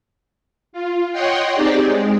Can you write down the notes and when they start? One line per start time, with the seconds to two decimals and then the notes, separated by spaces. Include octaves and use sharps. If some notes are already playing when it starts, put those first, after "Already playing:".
0.73 F4
1.12 C#5 D#5 F#5 G5 C6
1.54 C4 D#4 G4 G#4 D5
1.85 G#3